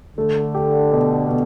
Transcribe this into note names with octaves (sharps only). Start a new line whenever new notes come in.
D3 A3
G4
B2
B2